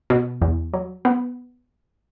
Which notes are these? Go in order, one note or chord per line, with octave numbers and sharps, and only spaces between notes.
B2
E2
F#3
B3